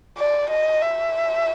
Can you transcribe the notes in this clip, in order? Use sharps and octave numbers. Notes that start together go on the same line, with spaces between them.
D5
D#5
E5